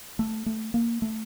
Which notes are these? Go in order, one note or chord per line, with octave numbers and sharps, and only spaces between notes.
A3
A3
A#3
A3